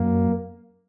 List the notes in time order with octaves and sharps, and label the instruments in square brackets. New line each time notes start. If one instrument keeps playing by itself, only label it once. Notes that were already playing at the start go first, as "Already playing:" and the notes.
Already playing: [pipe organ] F#2 A#3